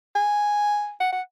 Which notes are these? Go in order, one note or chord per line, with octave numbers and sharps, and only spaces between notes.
G#5
F#5
F#5